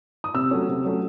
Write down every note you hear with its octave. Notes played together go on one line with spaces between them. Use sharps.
D#6
C3 E6
F#3 A3 C#4
C3
F#3 A3 C#4